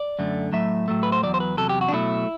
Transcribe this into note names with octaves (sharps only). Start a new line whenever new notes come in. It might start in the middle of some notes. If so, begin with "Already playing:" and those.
Already playing: D5
F#2 D3 A3
A2 F#3 A3 E5
A2 F#3 A3
B4
C5
E2 C3 F#3 D5
C5
B4
E2 C3 F#3 A4
G4
F#4
D4
B2 F#3 A3 E4